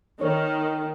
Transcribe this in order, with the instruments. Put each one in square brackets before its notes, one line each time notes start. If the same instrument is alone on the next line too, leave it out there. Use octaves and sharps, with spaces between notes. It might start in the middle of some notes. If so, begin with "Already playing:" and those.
[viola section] D#3 [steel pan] C#5